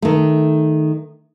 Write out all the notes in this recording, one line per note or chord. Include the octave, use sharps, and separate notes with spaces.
D#3 A3